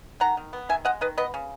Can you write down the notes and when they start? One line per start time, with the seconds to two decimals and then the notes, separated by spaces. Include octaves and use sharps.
0.20 D#3 F#5 A#5
0.37 D#3
0.53 B3
0.69 D#3 E5 G#5
0.85 G#3 D#5 F#5
1.01 D#3 B4 D#5
1.18 B3 B4 D#5
1.34 C#3